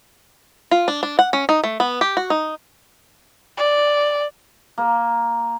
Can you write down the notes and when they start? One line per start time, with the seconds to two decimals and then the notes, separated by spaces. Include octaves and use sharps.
0.71 F4
0.88 D4
1.03 D4
1.19 F#5
1.33 C#4
1.49 D#4
1.64 A3
1.80 B3
2.01 G4
2.17 F#4
2.30 D#4
3.57 D5
4.78 A#3